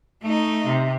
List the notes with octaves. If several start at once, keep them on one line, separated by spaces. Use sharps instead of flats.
A3 D#4
C3